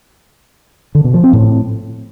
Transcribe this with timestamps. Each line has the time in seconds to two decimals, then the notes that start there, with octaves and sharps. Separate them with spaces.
0.95 D3
1.04 B2
1.14 F3
1.24 C4
1.33 A2